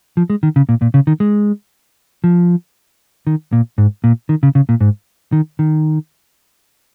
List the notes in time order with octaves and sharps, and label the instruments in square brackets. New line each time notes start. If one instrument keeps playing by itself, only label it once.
[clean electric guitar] F3
G#3
D#3
C#3
A#2
A#2
C#3
D#3
G#3
F3
D#3
A#2
G#2
A#2
D#3
C#3
C#3
A#2
G#2
D#3
D#3